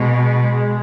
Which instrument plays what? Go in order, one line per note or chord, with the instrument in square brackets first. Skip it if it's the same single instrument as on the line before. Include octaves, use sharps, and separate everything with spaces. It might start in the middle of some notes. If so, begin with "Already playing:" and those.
Already playing: [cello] B2 [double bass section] G#3
[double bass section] G#3